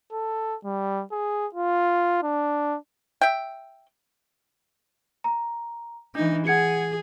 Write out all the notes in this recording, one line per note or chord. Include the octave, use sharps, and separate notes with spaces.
A4
G3
G#4
F4
D4
E5 G5
A#5
E3 D4 D#4
G#4 F#5 G#6 C#7